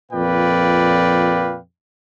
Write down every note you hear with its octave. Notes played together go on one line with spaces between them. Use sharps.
F2 A#2 B4 D5 F5 G5